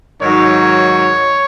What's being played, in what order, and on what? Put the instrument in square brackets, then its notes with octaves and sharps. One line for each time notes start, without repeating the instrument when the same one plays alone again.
[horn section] G#2 D#3 F#3 C#5